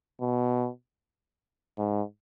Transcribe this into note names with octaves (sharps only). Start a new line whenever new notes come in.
B2
G#2